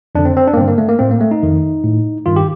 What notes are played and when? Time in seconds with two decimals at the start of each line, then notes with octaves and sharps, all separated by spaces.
0.15 F2 D3 D4
0.25 C4
0.37 C4
0.47 D4
0.54 A#3
0.57 G2 D3 C4
0.68 A#3
0.78 A3
0.88 A#3
0.99 A2 C4
1.11 A#3
1.21 A3
1.31 D#4
1.42 F2 D#3
1.84 A2
2.26 G2 D#3 F4
2.36 G4